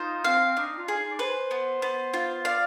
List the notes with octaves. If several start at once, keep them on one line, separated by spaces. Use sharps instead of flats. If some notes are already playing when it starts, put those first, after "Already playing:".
Already playing: D#4 F4 C5
C4 F5
D4 D#4
F4
G#4
D#4
D5
B4 C5
B3
B3
F4
C5
D5 F5